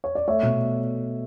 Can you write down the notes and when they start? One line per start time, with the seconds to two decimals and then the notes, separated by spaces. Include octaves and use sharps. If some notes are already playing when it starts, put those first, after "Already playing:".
0.04 C#5
0.15 D5
0.27 A3 C#5 E5
0.43 B2